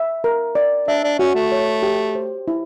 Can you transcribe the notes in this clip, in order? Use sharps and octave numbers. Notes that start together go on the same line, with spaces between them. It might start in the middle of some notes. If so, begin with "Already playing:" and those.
Already playing: E5
A#4
D5
D4 E5
D4
C#4 F#4
A3
C#5
G4
C5
E4